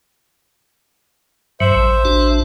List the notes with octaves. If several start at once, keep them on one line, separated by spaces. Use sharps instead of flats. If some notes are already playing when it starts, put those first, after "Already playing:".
G2 F#3 C5 E5
A1
A1 D4 F#4